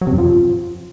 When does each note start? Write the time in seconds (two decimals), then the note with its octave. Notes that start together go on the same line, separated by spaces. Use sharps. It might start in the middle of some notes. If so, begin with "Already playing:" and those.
0.01 F#3
0.07 C3
0.13 F#2
0.18 F3